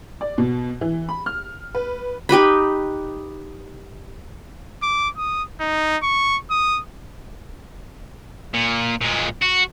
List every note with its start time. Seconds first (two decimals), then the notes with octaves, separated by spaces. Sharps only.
0.21 D5
0.38 B2
0.81 E3
1.09 B5
1.26 F6
1.75 B4
2.29 D#4 G4 B4 B5
4.83 D6
5.17 D#6
5.60 D#4
6.03 C#6
6.50 D#6
8.54 A#2
9.01 A#2 G#3
9.42 F#4